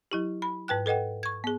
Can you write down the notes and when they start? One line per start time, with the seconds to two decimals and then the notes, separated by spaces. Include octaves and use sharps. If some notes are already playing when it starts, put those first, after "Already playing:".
0.11 F#3 E4 G4
0.42 B5
0.68 G#2 B4 G5 F#6
0.86 A4 B4 D#5 F#5 G5
1.23 C#6 G#6
1.44 B3 G#4